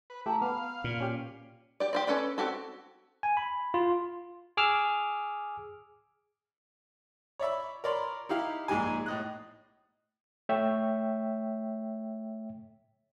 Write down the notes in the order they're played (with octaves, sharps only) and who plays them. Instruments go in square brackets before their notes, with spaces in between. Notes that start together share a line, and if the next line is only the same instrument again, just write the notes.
[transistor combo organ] B4
[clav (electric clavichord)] A3 G4 [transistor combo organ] E4 [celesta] A5 A#5
[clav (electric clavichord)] B3 [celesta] B4 B5 D6 [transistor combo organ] F5
[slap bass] A#2
[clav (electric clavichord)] C#4 G4
[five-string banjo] G4 D5
G4 C5 D5
C#4 A4 B4 D5
C4 F#4 G4 A4
[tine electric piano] G#5
B5
F4
G#4 D6 E6 F6
[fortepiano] C#5 D5 E5 B5
A#4 C#5 D5 B5 C6
D#4 E4 G4 F5
A#1 G#2 G#3 D#4 G4 G#5
A2 D#5 F#6
[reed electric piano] A3 C#5 E5 G5